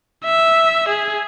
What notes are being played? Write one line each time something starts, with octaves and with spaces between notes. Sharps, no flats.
E5
G#4